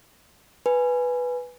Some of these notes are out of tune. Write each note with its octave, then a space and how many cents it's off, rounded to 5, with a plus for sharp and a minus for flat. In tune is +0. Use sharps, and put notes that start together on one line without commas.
B4 +0 G#5 +0